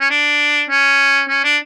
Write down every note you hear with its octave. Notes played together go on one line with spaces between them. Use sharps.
C#4
D4
C#4
C#4
D4